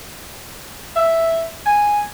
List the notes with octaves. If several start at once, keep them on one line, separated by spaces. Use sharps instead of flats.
E5
G#5